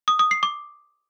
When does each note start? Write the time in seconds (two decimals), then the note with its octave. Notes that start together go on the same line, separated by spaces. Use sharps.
0.08 D#6
0.19 D#6
0.31 C7
0.43 D6